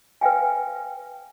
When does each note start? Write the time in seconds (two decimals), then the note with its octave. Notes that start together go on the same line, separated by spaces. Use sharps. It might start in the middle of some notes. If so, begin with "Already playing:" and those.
0.21 B4 F5 G5 G#5